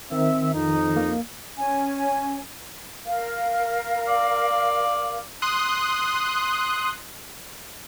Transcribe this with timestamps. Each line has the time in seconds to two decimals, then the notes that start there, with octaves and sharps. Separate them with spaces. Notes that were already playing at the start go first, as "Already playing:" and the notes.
0.12 D#3 C4 E5
0.54 F2 D#4
0.96 A#3
1.58 C#4 G#5
3.04 A#4 F5
4.08 D5
5.42 C6 D#6 F#6